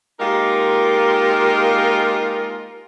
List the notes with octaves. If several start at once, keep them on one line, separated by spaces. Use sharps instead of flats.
G#3 A#3 D#4 F4 G4 A#4